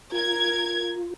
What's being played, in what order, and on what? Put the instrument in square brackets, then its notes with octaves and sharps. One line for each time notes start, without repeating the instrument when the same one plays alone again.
[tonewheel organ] F4 [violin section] A#4 G#6